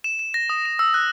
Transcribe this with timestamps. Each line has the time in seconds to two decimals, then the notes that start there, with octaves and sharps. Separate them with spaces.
0.04 E7
0.19 E7
0.34 A#6
0.50 D#6
0.65 E7
0.79 E6
0.94 F#6